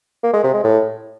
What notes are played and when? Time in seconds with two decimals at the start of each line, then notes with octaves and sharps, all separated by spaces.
0.23 A#3
0.34 G#3
0.44 C3
0.54 G#3
0.64 A2